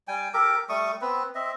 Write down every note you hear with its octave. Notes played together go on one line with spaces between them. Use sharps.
G3 G5 G#5
G4 A4 A#4 D6
G3 A3 C#6 D#6
B3 C4 B4
C4 D#5 E5